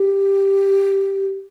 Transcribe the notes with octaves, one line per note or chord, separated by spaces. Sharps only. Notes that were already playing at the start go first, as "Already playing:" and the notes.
Already playing: G4